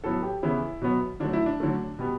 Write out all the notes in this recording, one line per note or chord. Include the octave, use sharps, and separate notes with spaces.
A2 F#3 B3 A4
G4
C#3 E3 B3 E4
B2 F#3 B3
D3 F#3 A3 D4
E4
D4
D3 F#3 A3
B2 G3 B3